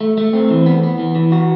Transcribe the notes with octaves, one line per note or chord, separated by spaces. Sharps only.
A3
A3
C4
E3
B3
B3
E3
E3
F#4